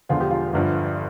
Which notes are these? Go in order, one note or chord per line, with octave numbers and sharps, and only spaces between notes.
E1 E2 D3 F3 F4
G4
F4
G1 G2 D3 F3